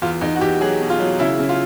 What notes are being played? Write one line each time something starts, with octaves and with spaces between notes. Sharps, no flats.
E2 F4
E2 D#4
F#4
E2 G4
F#3 G#4
B2
F4
F#3
C#3 E4
C#3
F4